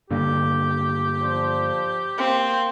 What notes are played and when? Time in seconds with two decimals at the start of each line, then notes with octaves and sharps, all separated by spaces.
0.10 G2 D3 A#3 G4
1.21 F3 D4 C5
2.18 A#3 C4 C6